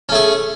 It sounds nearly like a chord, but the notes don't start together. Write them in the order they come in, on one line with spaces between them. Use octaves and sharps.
C#4 A3 G#4